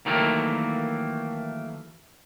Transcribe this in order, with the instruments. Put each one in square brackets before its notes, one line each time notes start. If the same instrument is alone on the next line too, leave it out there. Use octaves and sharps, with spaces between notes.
[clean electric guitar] D#3 E3 F#3 A3 A#3